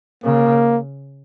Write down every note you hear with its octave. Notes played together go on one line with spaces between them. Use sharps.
C#3 A#3